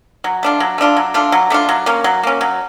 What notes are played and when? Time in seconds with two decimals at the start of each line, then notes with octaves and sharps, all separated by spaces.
0.24 F#3
0.43 A3 D4 F4
0.60 F#3
0.78 A3 D4 F4
0.97 F#3
1.14 A3 D4 F4
1.32 F#3
1.50 A3 D4 F4
1.69 F#3
1.86 A#3 C#4
2.04 F#3
2.23 A#3 C#4
2.41 F#3